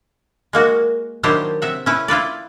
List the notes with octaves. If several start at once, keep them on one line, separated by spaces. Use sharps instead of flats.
G#3 A#3 F#4
D#3 F#3 D4 E4 G4 C5
C3 E5 F#5
C#4 E4 B4
E4 F4 B4 D5